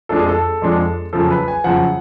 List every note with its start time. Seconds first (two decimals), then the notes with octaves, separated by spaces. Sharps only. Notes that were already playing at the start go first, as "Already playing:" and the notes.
0.09 F2 F3 G#3 D4 A4
0.19 G#4
0.29 A4
0.62 F2 F3 G#3 D4
1.13 F#2 C#3 F3 A4
1.30 B4
1.48 G#5
1.64 F#2 C#3 F3 F#5